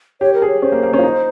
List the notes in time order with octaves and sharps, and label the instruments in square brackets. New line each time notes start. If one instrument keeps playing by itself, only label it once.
[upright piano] G4 [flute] C#5
[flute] A#4
[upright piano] G#4
[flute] C#5
[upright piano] C#4 [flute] C5
[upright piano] A#3
A#3
C#4
F4
D#4